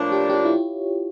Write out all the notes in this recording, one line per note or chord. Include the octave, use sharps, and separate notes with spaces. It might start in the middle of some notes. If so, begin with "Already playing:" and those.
Already playing: A2 F3 A#3 D4 C#5
G4
G4
F4
E4